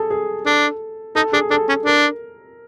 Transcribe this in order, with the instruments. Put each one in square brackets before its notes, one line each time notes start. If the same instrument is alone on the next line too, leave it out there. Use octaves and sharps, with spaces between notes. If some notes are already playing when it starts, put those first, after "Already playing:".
Already playing: [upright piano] G#4 A4
G#4
[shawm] D4 [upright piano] A4
[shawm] D#4 [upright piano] A4
[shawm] D4 [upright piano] G#4
[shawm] D4 [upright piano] A4
[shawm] C#4
[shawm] D4 [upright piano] A#4